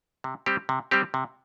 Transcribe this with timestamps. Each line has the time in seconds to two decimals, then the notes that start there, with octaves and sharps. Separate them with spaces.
0.24 C3
0.46 G3 C4 G4
0.69 C3
0.91 G3 C4 G4
1.14 C3